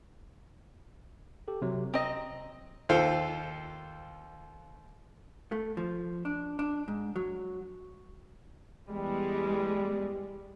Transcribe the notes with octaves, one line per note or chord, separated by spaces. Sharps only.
G4 A4
C3 F#3
C4 D#5 A#5
D#2 F4 A4 C5 F5 G5
A3
F3
D4
D4
G#2
F#3
E2 G3 G#3